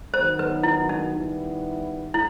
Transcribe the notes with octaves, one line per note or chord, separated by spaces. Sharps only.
D#3 F#3 B3 C5
B4
E4
D#4
D#3 G3 B3 E4
E4